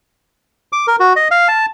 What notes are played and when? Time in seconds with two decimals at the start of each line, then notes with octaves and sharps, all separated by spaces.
0.73 D6
0.87 A#4
1.00 F#4
1.16 D#5
1.31 F5
1.48 A5